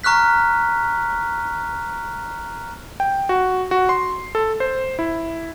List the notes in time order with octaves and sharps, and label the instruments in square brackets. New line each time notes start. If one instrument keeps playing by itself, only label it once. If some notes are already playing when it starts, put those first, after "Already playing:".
[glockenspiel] A#5 C#6 F6 F#6 B6
[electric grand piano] G5
F#4
F#4
C6
A4
C5
E4